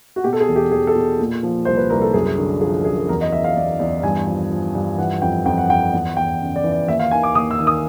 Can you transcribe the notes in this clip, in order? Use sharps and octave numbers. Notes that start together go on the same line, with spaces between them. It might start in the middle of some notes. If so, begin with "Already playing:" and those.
F#4
B2 G4
A4
G#4
E2
G4
E2 G#4
A4
B2
A#2
F3
C2 C5
B4
C2 A#4
A4
F#2 G#4
D3
F3 G#4
F#2 G#4
E2 A#4
D#5
E2 E5
F5
E2 D5
E2 D5
G2 G#5
F3
F3
G2
E3 F#5
F2 G5
F2 G5
F#5
F2 G5
E2 F#5
E2 G5
C#3
D5
E3
D5
D#2 E5
F5
D#3 G#5
D6
D#2 D#6
E6
D#3
D#6